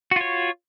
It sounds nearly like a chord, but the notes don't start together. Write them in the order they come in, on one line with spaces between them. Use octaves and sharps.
F#4 F4 C#5